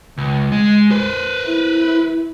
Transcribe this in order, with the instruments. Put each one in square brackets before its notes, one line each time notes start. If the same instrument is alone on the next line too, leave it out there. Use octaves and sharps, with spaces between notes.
[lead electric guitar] C#2
G#3
B4 C5
[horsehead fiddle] E4